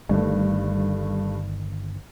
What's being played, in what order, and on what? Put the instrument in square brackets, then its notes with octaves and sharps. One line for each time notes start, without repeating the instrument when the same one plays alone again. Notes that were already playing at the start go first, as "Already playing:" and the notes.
[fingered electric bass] G1 D#3 [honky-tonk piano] G2 A3